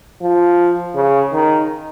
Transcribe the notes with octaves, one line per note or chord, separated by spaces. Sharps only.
F3
C#3
D#3